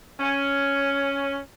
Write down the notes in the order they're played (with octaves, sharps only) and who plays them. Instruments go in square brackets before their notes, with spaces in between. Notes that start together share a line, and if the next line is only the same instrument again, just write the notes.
[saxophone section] C#4